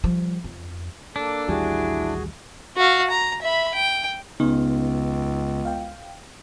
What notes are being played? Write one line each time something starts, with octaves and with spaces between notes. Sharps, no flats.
F3 G3
F2
A#3 D4 A4
A1 D#2 G3 E4 F#4 G#4 G#5
F#4 F5
A#5
E5 B5
G5
C#2 C#3 B3 D#4
F5 G5